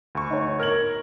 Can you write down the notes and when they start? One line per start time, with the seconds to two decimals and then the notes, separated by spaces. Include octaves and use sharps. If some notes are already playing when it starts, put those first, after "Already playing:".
0.15 D2 C#6
0.30 D#4 C#5
0.60 A#4 F6 G#6 F#7